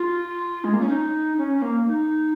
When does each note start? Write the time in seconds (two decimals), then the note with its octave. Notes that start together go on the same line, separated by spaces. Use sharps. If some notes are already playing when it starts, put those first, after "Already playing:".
Already playing: F4
0.64 G#3
0.73 A#3
0.81 C#4
0.89 D#4
1.38 C#4
1.58 C#4
1.62 A#3
1.88 D#4